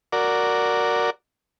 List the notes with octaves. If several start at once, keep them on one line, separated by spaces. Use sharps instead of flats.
F#4 A#4 D5